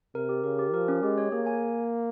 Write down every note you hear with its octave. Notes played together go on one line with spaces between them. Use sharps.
C3 A#4
G4
C#3 A#4
G4
F3 A#4
C#4
G#3 G4
C#5
A#3 G#4
G#5